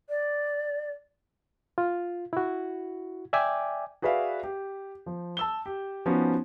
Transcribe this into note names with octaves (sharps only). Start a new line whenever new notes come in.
D5
F4
E4 F#4
D5 E5 G5 G#5 D6
F#4 G#4 B4 D5 E5 F5
G4
F3
A5 E6 G7
G4
F3 B3 C#4 D#4 F#4